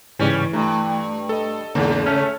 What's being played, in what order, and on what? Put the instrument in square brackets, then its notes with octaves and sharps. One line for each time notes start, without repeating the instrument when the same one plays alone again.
[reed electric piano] G#2 C#3 [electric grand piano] E3 [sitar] G3 C#4
[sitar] G2 [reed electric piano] A3 A#5
[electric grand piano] A4 D#5
[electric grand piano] E2 G#2 A#3 [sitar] C#3 [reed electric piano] A#5
[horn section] A3 C#4 [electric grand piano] A4 C#5 F6